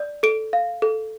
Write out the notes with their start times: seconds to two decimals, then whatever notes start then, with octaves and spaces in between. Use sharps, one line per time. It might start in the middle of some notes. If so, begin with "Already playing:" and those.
Already playing: D5
0.23 A4 D7
0.53 F5
0.82 A4